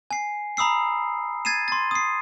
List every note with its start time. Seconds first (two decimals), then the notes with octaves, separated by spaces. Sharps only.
0.11 G#5 C7
0.57 A#5 B5 D#6 E6 C7
1.45 G#6 A6 C7 D#7 E7
1.68 C6 A6
1.91 D#6 C7